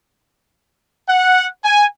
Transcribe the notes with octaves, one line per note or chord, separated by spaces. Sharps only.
F#5
G#5